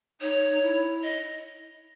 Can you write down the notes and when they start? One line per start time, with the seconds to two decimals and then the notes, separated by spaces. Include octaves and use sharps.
0.21 D#4 C#5
0.62 E4
1.03 D#5